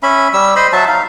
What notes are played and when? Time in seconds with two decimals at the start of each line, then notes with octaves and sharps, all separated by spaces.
0.03 C#4 E5 B5
0.33 G3 E6
0.56 C5 D#5 B5 C6
0.73 F#3 E5 A5
0.88 D#4 F5